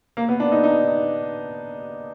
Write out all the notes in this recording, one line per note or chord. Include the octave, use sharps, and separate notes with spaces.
A#3
B3
D4
D#4
D#4